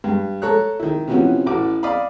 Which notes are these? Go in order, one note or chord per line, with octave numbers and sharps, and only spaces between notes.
G2
A4 C#5 A#5 F#6
D#3 E4
C3 E3 F3 B3 C#4 F#4
A1 A2 F#4 D6
D5 D#5 F5 B5